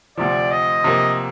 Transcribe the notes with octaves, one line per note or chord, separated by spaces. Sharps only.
D2 C3 F3 D5
D#5
C3 F3 A#3